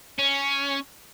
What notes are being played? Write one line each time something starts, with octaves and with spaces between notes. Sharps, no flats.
C#4